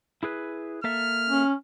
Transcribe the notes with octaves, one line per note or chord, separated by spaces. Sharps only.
E4 G#4 B4
A#3 A4 E5 F6
C#4